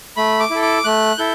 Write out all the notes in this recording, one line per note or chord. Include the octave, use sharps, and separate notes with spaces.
A3 B5
D6
E4 A4
D6
A3 F#6
E4 A4 G6